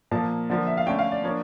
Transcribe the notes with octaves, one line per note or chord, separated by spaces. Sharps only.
A#2 F3 A#3 A5
D3 F3 A#3
E5
F5
D3 A3 C#4 G5
F5
D5
F3 A#3 D4 C#5